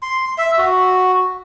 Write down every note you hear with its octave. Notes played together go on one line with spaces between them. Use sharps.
C6
E5
F#4